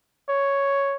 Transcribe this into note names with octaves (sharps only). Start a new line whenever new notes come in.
C#5